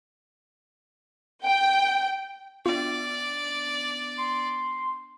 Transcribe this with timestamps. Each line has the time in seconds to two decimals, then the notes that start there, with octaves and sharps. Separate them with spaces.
1.44 G5
2.66 B3 D4 F4 D5
4.18 C6